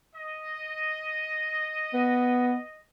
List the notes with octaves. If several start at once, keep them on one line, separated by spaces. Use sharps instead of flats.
D#5
B3